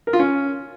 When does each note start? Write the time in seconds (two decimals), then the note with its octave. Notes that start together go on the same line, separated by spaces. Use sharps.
0.07 A#4
0.13 F4
0.19 C#4